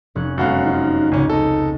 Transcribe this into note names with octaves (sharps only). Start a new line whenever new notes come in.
F1 C#4 F#6
F#2 G#3 B3 F#4 F5 G5
D#4 F4
G#1 C#2 C#4
D#4 A4